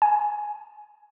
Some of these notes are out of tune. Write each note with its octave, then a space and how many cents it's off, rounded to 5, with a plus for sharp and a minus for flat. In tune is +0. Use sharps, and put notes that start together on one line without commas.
G#5 +10